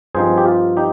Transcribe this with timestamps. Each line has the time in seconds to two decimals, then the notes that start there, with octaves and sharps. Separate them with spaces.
0.15 G2 F3 C4 D#4 G#4 C5
0.38 G4
0.46 F4
0.77 D#4 G4